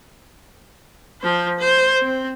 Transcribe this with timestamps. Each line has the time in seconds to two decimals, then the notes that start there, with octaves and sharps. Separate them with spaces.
1.21 F3 C5
1.59 C5
2.02 C4